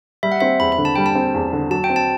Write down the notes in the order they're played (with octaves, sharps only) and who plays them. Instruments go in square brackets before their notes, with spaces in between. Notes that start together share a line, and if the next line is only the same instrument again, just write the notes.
[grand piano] G3 [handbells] E5
[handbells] F#5
[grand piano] C4 [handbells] E5
[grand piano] E2 [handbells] B5
[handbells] B5
[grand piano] D3
[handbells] A5
[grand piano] G3 [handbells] G5
[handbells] A5
[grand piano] C4
E2
D3
[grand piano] F#3 [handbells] A5
[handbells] G5
[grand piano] C4
[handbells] A5